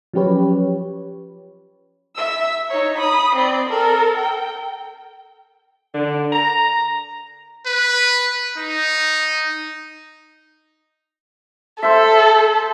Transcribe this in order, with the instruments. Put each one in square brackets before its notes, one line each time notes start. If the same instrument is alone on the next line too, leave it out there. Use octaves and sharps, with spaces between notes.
[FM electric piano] F3 F#3 C#4 G4 B4 C#5
[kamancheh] E5 E6
D#4 C#5
B5 D#6
C4 D5
A4 A#4
G5
[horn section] D3
A#5
[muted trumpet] B4
D#4
[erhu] A4 [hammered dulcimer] C5 E5